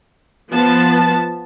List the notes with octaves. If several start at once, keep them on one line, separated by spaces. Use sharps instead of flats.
F3 B3 A5